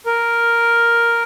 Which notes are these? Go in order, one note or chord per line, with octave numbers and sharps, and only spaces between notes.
A#4